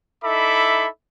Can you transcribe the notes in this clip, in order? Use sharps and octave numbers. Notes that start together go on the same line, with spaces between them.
D#4 E4 A4 E5 B5 D6